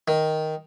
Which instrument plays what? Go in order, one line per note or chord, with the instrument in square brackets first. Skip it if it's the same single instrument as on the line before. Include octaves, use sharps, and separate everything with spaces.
[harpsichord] D#3